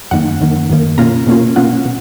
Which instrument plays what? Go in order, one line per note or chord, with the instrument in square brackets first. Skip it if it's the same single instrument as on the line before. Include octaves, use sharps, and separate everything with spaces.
[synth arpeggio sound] F#2 D#3 A#3 F#5
F#2 D#3 A#3
F#2 D#3 A#3
B2 A#3 C#4 F4 A#5
B2 A#3 C#4 F4
B2 A#3 C#4 F4 F#5
B2